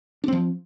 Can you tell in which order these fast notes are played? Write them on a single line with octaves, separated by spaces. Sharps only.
D4 C4 F3